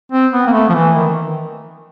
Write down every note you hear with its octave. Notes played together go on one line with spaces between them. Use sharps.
C4
B3
A#3
A3
F3
E3
D#3